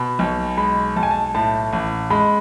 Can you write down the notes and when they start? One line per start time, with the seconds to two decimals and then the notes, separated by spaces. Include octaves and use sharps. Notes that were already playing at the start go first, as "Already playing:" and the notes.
Already playing: B2 B5
0.19 B1
0.57 G#3 B5
0.96 B1 A5
1.03 G#5
1.11 A5
1.35 A2 A5
1.73 A1
2.10 G#3 B5